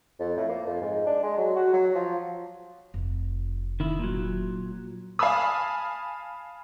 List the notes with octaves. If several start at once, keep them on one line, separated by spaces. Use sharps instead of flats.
F2
A2
A#3
F2
G#2
D4
G#3
F#3
F#4
F#3
F3
F1
D#3 E4
A#2 F#3
F5 G#5 A5 B5 D#6